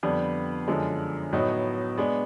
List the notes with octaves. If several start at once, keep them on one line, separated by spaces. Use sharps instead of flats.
F2 D3 G3 B3 D4
F#2 D3 F3 G#3
A2 F#3 B3 D#4
G#3 B3 D4